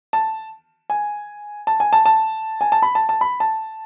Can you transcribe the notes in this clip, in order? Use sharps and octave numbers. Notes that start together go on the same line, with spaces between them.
A5
G#5
A5
G#5
A5
A5
G#5
A5
B5
A5
A5
B5
A5